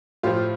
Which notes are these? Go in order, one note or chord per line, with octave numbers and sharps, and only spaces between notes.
A2 F3 F4 G4